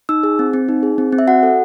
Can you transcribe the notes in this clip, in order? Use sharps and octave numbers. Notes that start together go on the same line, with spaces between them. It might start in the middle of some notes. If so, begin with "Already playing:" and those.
D#4 E6
G#4
C4
C4
D#4
G#4
C4
C4
E5
F#4 F#5
A4